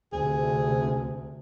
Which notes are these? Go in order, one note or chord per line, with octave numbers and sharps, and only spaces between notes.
D2 C3 G#4